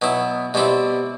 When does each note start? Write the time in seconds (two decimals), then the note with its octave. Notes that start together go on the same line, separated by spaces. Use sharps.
0.02 B2 F#3 B3 E4
0.54 B2 G3 C4 E4 G4